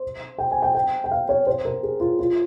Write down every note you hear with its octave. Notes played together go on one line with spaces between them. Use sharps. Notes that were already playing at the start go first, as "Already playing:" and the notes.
Already playing: C5
G5
G#5
G5
G5
G5
F5
C#5
C5
A#4
G#4
F4
F4